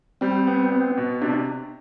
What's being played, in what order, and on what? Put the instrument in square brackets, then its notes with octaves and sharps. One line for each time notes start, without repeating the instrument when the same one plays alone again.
[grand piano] G3 [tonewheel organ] C4
[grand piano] B3
B3
B2
[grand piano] C3 [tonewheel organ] D4